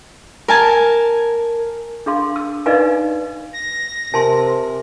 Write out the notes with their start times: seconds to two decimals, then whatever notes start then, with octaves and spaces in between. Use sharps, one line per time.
0.48 A#4 G#5 A5
2.06 D4 G#4 F5 C6
2.36 E6
2.66 D#4 B4 D5 D#5 F5 G#5
3.53 A#6
4.14 C3 A#4 G#5 A5 C6